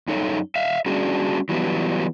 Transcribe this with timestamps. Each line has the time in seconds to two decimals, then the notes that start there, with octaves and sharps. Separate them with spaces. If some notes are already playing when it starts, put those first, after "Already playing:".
0.08 F#2 D#4 A4 C#5
0.55 E5 F5
0.86 G3 C#4 D4 F#4 G#4
1.49 E3 F#3 G3 B3